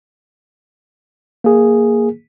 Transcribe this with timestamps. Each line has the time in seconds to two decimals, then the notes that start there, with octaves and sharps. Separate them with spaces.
1.44 A#3 G#4